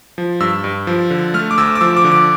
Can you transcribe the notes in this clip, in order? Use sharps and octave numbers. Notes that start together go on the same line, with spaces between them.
F3
G2 E6
G2
F3
D3
A3 F6
D6
D2 E6
D6
F3 E6
D6
D3
D6